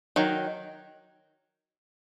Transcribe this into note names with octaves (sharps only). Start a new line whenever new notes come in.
D#3 F#3